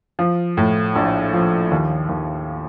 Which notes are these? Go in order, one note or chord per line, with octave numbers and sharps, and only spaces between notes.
F3
A2
A#1
F3
D#2
D#2